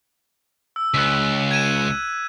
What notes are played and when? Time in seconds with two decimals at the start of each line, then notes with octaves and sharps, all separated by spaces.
0.76 E6
0.94 C#2 F#6 B6
1.51 G#6 D#7 E7